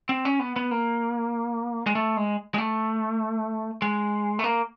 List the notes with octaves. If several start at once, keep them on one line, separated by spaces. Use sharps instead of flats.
C4
C#4
B3
B3
A#3
G#3
A3
G#3
G#3
A3
G#3
A3
A#3